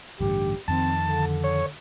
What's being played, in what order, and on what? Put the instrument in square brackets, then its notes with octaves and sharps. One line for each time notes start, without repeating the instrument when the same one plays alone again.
[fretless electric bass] A1 G2 D3 [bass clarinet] G4
[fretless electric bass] F2 D#3 [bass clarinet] C4 [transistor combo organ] A5
[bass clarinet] D3
[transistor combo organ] C#5